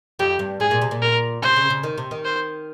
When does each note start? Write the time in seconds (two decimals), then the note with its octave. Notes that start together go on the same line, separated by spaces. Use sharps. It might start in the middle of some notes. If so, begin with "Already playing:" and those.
0.19 F2 G4
0.39 G2
0.60 G#2 G#4
0.71 A#2
0.82 C3
0.91 A#2
1.02 A#4
1.43 C3 C5
1.56 C#3
1.70 C#3
1.83 D#3
1.98 C3
2.11 D#3
2.25 C5